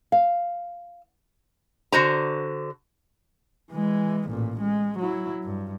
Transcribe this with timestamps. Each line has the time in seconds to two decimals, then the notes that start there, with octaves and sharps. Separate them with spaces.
0.12 F5
1.92 D3 F#4 C5 A#5
3.72 E3 G#3
4.30 A1 A#2
4.61 G#3
4.99 F#3 E4
5.43 G2